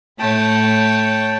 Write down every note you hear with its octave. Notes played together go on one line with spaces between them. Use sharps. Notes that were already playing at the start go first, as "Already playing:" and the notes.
A2 A3 C#5 G5 A5